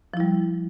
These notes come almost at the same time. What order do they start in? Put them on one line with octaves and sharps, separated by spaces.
F3 E4 G3